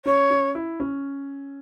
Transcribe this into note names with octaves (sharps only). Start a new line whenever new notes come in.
C#4 C#5
C#4
E4
C#4